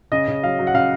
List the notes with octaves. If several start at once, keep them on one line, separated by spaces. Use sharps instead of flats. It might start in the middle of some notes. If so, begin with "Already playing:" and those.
C#3 D#5
C#3
F#3 F5
F#3
F#5
C#3 F5